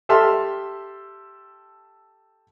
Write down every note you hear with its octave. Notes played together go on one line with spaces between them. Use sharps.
G4 A4 E5 A5 C6 F6